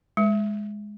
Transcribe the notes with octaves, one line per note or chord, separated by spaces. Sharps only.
G#3